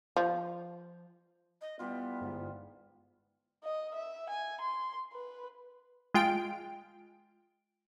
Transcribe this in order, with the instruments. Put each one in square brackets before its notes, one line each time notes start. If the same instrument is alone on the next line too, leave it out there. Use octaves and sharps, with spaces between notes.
[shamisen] F3
[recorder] D#5
[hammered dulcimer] E3 G3 F4 [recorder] B3
[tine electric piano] G1 G#2
[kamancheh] D#5
E5
G#5
C6
B4
[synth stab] G#3 F4 G5 D7